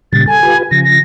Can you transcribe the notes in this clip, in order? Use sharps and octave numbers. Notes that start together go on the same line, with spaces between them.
A#2 C#3 G3 A6
A4 G#5
F4 G4 B4
C#3 F3 A#6
A#6